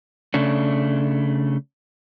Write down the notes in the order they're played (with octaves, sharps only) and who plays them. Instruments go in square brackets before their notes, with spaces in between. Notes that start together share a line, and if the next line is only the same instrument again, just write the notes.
[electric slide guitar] C#3 A3 D4